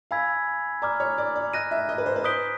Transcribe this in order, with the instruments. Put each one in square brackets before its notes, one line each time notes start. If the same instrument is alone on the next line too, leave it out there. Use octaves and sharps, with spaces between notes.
[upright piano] F5 [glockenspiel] G#5 B5 E6 G#6 B6
[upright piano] D5 [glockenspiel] A#5 D6 F6
[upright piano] C#5
D5
D5
[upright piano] D#5 [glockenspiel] F#6 A#6 D#7
[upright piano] E5
D#5
B4
C5
B4
[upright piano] C5 [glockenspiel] D#6 G6 B6 D7 G7